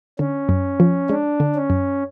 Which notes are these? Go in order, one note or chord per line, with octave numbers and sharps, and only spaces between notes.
D3 C#4
F#2
F3
G#3 D4
D3
C#4
F#2